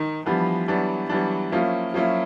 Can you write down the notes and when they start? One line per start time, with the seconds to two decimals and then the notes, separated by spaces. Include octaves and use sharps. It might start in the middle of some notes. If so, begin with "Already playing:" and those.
Already playing: D#3
0.25 E3 F3 G3 B3 D4
0.68 E3 F#3 G3 B3 D4
1.09 E3 F#3 G3 B3 D4
1.52 F3 F#3 A#3 C#4 E4
1.94 F3 F#3 A#3 C#4 E4